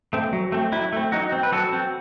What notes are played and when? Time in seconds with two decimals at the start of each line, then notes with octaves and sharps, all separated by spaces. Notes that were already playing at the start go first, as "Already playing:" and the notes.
0.13 A3 C4
0.33 F#3
0.52 A3 C4
0.72 F#3 E4
0.93 A3 C4
1.12 F#3 D#4 F#4
1.32 C4
1.43 B4
1.52 F#3 F#4 A4
1.73 C4